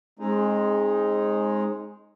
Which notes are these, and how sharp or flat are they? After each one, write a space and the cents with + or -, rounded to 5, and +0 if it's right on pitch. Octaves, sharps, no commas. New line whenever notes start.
G#3 +0 C4 +35 D#4 +0